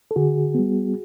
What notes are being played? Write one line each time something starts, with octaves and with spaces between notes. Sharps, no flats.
A4
D3 F#4 G#4
G3 B3